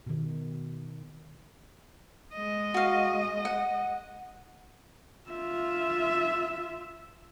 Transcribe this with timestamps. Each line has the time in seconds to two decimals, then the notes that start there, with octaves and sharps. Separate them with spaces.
0.06 B2 D#3
2.33 G#3 D#5
2.74 F#4 F5
3.45 F#5
5.30 F4 E5